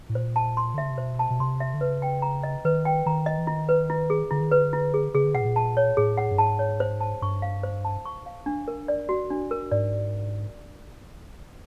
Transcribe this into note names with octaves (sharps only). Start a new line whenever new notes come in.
A2
A#2 C5
A5
C6
D3
C#3 E5
C3
B2 C5
A5
B2
C3 C6
E5
D3
C#3 B4
G5
A#5
D#5
D#3 B4
G5
D#3 A#5
D#5
E3
D#3 E4
B4
E4
G#4
D3 E4
D#3
D3 B4
E4
G#4
C#3 G#4
D3
B2 F#5
A2
A#2
A5
C#5
A2 G#4
F#5
G2
G#2 A5
C#5
C5
A5
G2 C#6
F5
C5
A5
C#6
F5
D4
A#4
D5
F#4
D4
A#4
G#2 D5